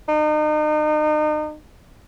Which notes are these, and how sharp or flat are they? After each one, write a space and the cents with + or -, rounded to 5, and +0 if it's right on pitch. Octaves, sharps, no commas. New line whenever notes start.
D#4 -35